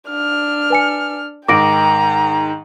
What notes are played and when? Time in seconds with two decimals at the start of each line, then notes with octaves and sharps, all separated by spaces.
0.10 D4 F6
0.70 B4 G#5 C#7
1.48 G#2 D#3 G5 A#5 D6 A#6 D7